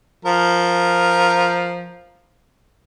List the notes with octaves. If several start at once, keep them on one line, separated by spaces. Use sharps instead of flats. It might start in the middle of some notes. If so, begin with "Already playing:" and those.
F3 A#4